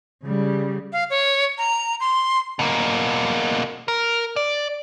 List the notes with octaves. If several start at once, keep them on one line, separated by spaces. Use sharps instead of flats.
C#3 G3
F5
C#5
A#5
C6
B2 A#3
A#4
D5